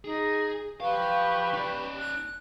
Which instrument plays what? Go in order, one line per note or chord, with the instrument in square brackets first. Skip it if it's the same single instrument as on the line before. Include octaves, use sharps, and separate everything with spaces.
[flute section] D#4 [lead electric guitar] G#4
[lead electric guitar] F3 F5 [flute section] G4 B4 C#6
[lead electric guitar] D#4 D5
[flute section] F#6